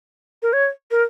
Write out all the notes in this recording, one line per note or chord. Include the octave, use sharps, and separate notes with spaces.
A#4
C#5
A#4